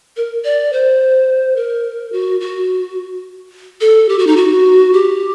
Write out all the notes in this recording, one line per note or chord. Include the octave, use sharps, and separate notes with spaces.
A#4
D5
C5
A#4
F#4
F#4
A4
G4
F#4
D#4
F#4
G4